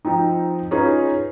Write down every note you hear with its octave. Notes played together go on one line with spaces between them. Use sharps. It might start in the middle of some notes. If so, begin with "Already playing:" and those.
F3 C4 D#4
C#4 D#4 F4 G#4 B4